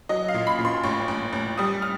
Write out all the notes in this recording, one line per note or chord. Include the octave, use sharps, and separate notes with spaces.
F#3 D#5
F5
A#2
B5
A#2
C6
A1 C#6
A1
A1
G3 D#6
F6